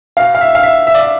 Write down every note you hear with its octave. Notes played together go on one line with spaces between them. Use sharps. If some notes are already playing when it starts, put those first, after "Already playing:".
B2 F5
F5
E5
F5
E5
E5
D5
E5